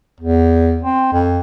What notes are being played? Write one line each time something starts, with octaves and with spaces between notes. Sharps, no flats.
E2
C4
F2